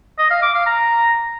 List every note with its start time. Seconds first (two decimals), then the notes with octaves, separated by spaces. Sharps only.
0.19 D#5
0.31 F5
0.43 D6
0.55 F5
0.66 A#5